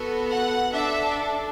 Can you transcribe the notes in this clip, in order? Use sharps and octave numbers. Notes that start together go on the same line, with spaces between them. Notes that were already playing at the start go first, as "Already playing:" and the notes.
Already playing: B3 F#4 A4
F#5
D4 A4 E5